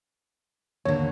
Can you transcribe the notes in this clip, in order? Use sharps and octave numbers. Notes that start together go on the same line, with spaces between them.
D#2 D3 C#5